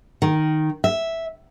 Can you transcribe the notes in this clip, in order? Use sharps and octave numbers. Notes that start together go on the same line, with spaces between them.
D#3
E5